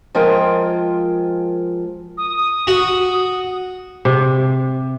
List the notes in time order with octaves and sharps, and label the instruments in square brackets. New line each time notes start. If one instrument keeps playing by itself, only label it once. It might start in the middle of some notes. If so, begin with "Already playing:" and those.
[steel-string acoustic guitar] F3 G#3 F4 A#4 G5
[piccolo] D#6
[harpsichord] F#4
[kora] C3